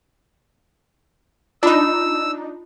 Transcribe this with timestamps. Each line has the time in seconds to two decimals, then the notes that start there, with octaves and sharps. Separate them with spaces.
1.63 D4 D#4 F4 B5 E6